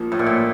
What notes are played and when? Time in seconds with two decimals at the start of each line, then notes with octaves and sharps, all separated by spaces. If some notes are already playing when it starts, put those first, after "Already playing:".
Already playing: A#1 F3 A#3
0.12 A2 F3
0.19 A#2
0.26 A2